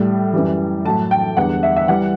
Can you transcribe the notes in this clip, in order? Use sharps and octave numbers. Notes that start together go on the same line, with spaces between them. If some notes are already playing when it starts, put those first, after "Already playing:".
Already playing: A2 G3
F#2 E3 G3
A2 F#3 A5
G5
E2 D3 G3 F#5
E5
E5
E3 G3 F#5